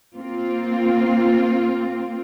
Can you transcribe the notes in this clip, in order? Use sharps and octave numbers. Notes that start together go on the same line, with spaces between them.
A#3 C4 F4